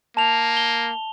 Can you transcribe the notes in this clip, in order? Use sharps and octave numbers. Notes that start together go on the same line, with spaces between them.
A#3 A5 F7
G7